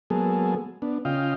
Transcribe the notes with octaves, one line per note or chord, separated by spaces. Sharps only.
F#3 G#3 A#3 B3 G#4 A4
B3 D4
C#3 F4 D#5 F5 G5